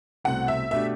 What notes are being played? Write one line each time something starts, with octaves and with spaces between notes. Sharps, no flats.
C2 B2 A3 C4 F#5
E5
B2 A3 D4 G4 E5